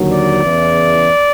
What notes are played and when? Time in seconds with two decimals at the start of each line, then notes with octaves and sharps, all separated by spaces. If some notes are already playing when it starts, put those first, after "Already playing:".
Already playing: D#2 D3 F#3
0.10 D5
0.43 E2 C#3 E3